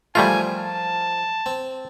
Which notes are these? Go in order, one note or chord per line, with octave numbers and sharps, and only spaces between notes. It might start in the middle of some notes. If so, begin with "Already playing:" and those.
F3 G3 A3 F4 A#4 G#5
A5
C4